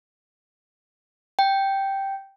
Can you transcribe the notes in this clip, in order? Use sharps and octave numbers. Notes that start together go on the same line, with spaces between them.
G5